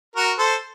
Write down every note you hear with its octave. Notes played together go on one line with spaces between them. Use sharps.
F#4 A#4
A4 C5